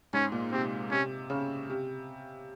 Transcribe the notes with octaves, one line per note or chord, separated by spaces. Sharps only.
G#2 C#4
A#2
C3 C4
C3 C#4
C#3
C3